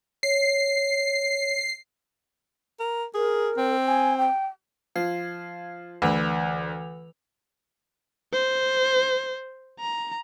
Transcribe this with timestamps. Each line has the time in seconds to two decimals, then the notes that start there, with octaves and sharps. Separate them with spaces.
0.23 C#5 C7
2.79 A#4
3.14 G#4 A#4
3.57 C4
3.86 G#5
4.18 G5
4.96 F3 F5 G#6 C7
6.02 D2 E3 B4 F7
8.33 C5
9.80 A#5